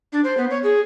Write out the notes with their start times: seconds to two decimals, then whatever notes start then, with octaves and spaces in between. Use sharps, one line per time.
0.13 D4
0.24 C5
0.37 B3
0.50 C#5
0.63 G#4